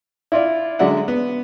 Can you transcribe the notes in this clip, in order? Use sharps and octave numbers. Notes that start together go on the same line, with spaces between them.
E4 F4 D5
D3 F#3 G#3 D5 E5 F#5
B3